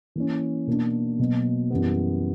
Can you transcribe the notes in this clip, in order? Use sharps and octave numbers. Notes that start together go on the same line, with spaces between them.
E3 A#3 C#4
B2 A#3 D4
B2 F#3 A#3
F#2 E3 G3 B3